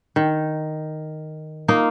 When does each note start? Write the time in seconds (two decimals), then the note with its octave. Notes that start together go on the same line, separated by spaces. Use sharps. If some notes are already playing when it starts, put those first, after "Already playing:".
0.16 D#3
1.68 A#3 D#4 F4